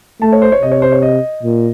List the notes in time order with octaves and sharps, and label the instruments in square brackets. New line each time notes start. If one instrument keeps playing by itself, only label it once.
[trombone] A3 [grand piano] A5
[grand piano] C#5
C5
C#5
[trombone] C3 [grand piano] D#5
[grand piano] C#5
C5
C#5
D#5
[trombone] A#2